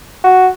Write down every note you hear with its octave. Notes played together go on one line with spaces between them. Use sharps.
F#4